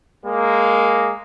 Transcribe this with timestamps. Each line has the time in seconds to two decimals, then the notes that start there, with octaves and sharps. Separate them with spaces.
0.25 G#3 A#3